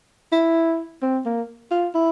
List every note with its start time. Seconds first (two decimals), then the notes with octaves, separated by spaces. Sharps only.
0.32 E4
1.02 C4
1.26 A#3
1.72 F4
1.95 E4